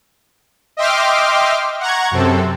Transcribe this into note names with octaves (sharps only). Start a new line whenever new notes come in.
D#5 E5 G5 C6 D6 F6
F#5 A#5 C#6 G#6
F#2 C3 C4 A4